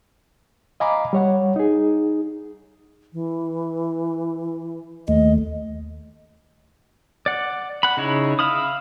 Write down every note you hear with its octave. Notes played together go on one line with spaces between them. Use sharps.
D#5 F5 G#5 A#5 B5 D6
G3 C#5 F#5
D#4 G#4
E3
D#2 A3 D#5
D5 F#5
F#5 B5
C#3 D#4 E4 C#5
E5 F5 B5 D#6